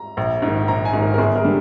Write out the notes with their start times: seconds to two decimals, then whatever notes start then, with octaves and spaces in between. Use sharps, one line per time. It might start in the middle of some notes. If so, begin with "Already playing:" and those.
Already playing: A#5
0.17 A#1
0.42 G#2
0.47 D#3
0.68 A#1 A#5
0.85 G#5
0.93 G#2 D#3
1.02 A#4
1.14 A#4
1.18 G1 G#4
1.35 A#4
1.44 D3 G3 A#3